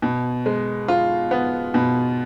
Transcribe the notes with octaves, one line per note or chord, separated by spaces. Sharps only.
B2
G#3
F4
B3
B2